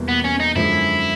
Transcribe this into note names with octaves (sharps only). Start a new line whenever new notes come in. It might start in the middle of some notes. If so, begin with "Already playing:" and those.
Already playing: E2 B2 G3 A#3
B3
C#4
D#4
F#2 D3 F3 G#3 E4